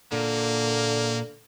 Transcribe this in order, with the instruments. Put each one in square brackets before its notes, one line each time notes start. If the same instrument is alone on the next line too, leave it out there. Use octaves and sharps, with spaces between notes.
[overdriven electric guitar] A#2 [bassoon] D3 [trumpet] A#3